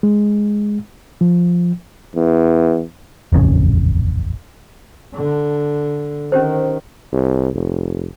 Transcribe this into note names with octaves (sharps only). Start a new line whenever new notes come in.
G#3
F3
E2
D#1 A1 F2 C#3
D3
D#3 C#4 G4 C5
C2
F1